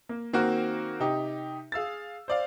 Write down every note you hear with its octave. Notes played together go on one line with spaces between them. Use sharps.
A#3
D#3 A#3 C4 F#4 A#4
C3 D#4 G4
G#4 F5 E6 A6
C5 D5 F5